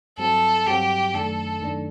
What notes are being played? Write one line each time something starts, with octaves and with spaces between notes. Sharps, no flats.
G2 F#3 C4 F#4 A4
G2 F#3 C4 F#4 G4
F#2 D#3 A3 D4 A4
F#2 D#3 A3 D4